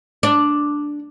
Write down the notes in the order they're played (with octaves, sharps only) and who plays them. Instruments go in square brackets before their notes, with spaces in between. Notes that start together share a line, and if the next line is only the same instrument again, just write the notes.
[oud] D4